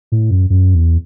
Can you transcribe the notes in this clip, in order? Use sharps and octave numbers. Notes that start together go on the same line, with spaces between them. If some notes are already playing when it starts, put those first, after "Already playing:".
A2
F#2
F#2
E2